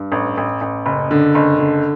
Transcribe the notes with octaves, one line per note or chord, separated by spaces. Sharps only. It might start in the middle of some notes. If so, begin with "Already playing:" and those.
Already playing: G2
A1
A1
A1
F#1
D3
F#1
D3